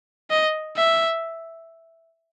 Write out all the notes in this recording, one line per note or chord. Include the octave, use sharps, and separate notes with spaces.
D#5
E5